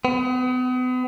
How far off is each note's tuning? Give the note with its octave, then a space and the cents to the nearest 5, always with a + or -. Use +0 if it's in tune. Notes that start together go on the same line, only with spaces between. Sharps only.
B3 +40